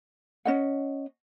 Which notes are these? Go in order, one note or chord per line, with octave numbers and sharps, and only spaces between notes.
C#4 D#5 F#5